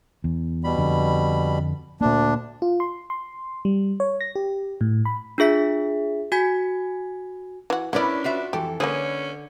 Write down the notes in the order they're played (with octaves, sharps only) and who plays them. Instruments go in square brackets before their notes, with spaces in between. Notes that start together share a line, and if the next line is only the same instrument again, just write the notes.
[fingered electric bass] E2
[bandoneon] B2 G3 B5
[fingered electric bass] F2 D3
[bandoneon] D2 D4 [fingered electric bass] A#2 A#3
[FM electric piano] F4
C6
C6
G3
C#5
A#6
G4
A2
B5
[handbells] D4 F4 G#4 E5 B6
F#4 G#5 G#6 B6
[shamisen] E3 F#4
[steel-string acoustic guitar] C#4 B4 [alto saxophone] D4 [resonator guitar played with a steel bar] E4 A#4 C#5 [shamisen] D5 F#5
[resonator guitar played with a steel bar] F4 F#4 E5
[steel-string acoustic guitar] F2 E3 A4 [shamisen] G4
[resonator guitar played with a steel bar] D3 [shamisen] A#3 G#4 [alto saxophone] C#4 [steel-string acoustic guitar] B4 C#5